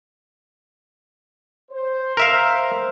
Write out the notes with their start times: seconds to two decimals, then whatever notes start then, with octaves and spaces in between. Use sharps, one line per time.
1.71 C5
2.17 A#4 E5 F5